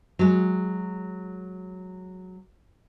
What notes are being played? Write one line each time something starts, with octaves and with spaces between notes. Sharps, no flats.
F#3 G#3